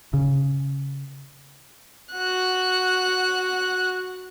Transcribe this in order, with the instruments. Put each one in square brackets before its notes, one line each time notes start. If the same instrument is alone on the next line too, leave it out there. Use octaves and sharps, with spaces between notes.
[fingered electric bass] C#3
[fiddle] F#4 F#6